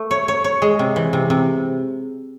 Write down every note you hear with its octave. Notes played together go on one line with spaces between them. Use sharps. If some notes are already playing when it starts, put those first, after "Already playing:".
Already playing: A3
C#5
C#5
C#5
G#3
C3
E3
C3
C3